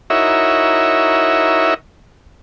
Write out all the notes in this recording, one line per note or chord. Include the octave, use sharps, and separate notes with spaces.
D#4 E4 F#4 A#4 C#5 E5